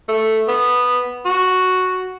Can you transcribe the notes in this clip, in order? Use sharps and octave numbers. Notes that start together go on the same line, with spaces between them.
A3
B3
F#4